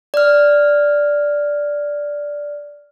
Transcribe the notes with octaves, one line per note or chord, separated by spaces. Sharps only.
D5 F6